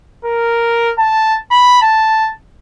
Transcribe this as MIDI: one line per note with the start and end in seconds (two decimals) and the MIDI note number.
0.25 0.92 70
0.99 1.36 81
1.51 1.82 83
1.82 2.30 81